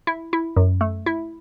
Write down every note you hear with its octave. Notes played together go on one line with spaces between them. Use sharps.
E4
E4
F#2
A3
E4